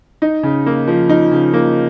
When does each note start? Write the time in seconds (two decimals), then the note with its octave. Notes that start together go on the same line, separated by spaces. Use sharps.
0.22 D#4
0.43 C#3
0.66 A#3
0.87 F3
1.09 D#4
1.32 C#3
1.54 A#3